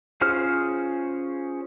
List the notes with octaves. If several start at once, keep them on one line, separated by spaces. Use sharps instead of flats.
C#4 F4 G#4 C5 F6